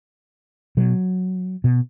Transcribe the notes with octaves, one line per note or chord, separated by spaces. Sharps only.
B2 F#3
B2